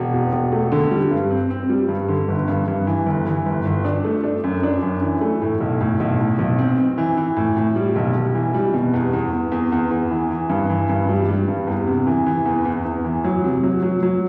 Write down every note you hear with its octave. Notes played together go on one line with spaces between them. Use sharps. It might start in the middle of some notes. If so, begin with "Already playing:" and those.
Already playing: E1
E2
E1
A3
D3
G3
G2
C4
C4
G3
G2
D3
G1
G2
G2
E3
G1
E3
G1
G1
D4
A3
D4
F#2
D4
F#2
E3
A3
A2
B1
A2
B1
A2
B1
C4
C4
E3
E3
A2
A2
G3
B1
B1
E3
G3
B2
E2
E2
E2
E2
E2
E2
E3
E3
G2
E3
G2
G3
G3
G2
E2
C3
E3
E3
E2
E2
E2
E3
F#3
C3
F#3
F#3
F#3